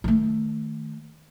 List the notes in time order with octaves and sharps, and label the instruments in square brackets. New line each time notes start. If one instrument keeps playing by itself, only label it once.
[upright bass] D#3 A3